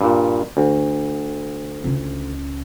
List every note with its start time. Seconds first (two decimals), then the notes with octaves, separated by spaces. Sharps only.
0.01 G2 A#2
0.57 D2
1.84 C#2 C#3